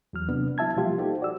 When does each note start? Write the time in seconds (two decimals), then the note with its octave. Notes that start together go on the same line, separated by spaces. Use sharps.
0.13 E2 F#3 F6
0.29 C3 B3 D4
0.58 F#3 E4 E5 A5 G#6
0.76 B2 F3 G3 A#3 F4 G4
0.98 D#4 F#4 G4 A4 C5
1.20 F#4 D5 E6